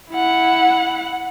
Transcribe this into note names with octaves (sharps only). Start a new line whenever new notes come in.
E4 F#5